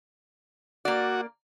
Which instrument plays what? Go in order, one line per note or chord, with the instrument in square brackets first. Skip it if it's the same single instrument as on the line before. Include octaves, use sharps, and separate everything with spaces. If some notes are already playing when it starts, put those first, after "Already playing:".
[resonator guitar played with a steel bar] A#3 D5 [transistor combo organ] F#4